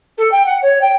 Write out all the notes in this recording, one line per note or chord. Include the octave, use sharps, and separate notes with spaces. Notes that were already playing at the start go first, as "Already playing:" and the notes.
A4
G5
F#5
C#5
G5